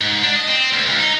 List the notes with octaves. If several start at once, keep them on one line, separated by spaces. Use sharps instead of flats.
G#2
D4
D#5
C4
D2
C#2
D#4